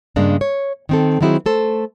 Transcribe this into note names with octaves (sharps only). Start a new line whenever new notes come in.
G2 C#3 G#3 A#3 D4
C#5
D#3 C4 A4
D#3 F#3 C4 E4 F#4 G#4
A3 A4 C5